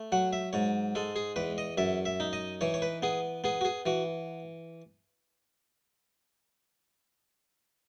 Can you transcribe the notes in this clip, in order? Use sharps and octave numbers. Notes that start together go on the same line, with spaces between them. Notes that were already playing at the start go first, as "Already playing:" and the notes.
Already playing: A3
F#3 F#5
E5
G#2 C#5
G#3 A4
G#4
E2 B4
D#5
F#2 E5
E5
D#4
D#5
E3 C#5
C#5
B4
B3 G#4
B3 G#4
F#4
G#4
E3 F#4